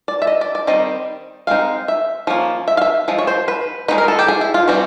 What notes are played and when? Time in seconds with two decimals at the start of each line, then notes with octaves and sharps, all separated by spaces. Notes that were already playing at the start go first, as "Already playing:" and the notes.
0.08 D5
0.22 E5
0.27 D#5
0.41 D5
0.55 D5
0.67 D#3 G3 C4 D#5
1.47 G#3 C4 D#4 F5
1.88 E5
2.27 F3 A#3 C#4
2.68 E5
2.77 F5
2.82 E5
3.08 F3 G#3
3.19 C#5
3.27 C5
3.48 B4
3.88 G#3 C4 D#4 B4
3.98 A#4
4.08 A4
4.19 G4
4.28 G#4
4.41 E4
4.54 F4
4.68 E3 G3 C4 F#4